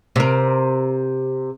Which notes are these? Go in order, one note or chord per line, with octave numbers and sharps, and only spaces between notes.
C3 A#4